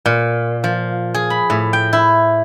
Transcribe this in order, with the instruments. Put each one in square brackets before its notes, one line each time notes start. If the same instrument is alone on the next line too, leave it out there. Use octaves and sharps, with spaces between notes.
[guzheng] A#2
F3
G#4
B5
A2
G5
E4